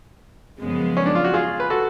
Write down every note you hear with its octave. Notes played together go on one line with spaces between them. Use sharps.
F#2 C#3 F3 G#3 B3
C#4
D4
F4
F#4
F4 G#4
B4
F#4 A4